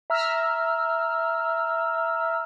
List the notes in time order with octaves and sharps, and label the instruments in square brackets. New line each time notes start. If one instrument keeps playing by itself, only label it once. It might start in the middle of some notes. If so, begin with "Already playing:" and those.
[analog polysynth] E5 A#5 E6 F6